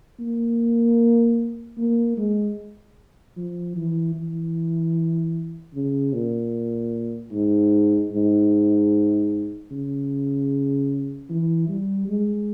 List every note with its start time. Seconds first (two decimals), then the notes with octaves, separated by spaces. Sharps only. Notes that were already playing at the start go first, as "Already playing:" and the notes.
0.19 A#3
1.78 A#3
2.18 G#3
3.37 F3
3.76 E3
4.15 E3
5.74 C#3
6.13 A#2
7.32 G#2
8.12 G#2
9.71 C#3
11.30 E3
11.69 G3
12.08 G#3